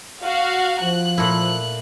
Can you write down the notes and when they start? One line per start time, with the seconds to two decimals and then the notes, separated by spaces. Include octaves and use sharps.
0.23 F#4 F5
0.83 F3 F#6
1.18 A#2 A3 E4